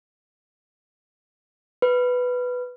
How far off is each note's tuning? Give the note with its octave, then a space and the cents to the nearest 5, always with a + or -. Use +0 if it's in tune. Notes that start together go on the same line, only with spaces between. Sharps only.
B4 +5